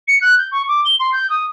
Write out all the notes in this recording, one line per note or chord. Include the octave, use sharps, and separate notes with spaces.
C#7
F#6
G6
C#6
D6
G7
C6
G6
D#6